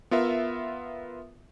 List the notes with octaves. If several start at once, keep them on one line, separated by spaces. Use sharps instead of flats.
B3 F4 A#4 E5